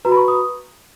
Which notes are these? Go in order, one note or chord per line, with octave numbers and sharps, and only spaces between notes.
F#4 B4 A#5
B5
C#6
D#6